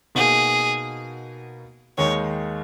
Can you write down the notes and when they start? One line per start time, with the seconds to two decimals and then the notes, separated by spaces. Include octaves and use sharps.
0.15 B2 A#3 D#4 F#4 G#4
1.98 D#2 D#3 G#3 D#4 C#5